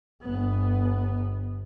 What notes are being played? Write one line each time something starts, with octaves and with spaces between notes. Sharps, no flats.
G1 B3